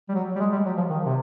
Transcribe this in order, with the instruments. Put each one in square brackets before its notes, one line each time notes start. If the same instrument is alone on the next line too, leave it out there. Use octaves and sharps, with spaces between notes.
[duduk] G3
F#3
G3
G#3
G3
F#3
F3
D#3
C3